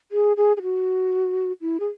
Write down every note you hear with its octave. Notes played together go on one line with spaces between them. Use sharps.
G#4
G#4
G#4
F#4
E4
G#4